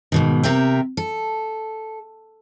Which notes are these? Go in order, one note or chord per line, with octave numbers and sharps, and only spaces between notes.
G#2 B2 D#3
C3 A#4 E5 G5
A4